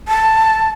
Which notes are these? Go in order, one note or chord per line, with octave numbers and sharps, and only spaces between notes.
A5